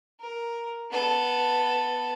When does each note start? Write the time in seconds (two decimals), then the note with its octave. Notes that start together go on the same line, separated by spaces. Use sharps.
0.20 A#4
0.91 B3 A4